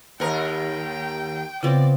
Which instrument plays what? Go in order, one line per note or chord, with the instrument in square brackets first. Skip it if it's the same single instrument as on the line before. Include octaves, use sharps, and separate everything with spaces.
[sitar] D#2 A#4 [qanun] F#5 [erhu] G5
[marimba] C#3 [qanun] F3 B3 C4 [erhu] D5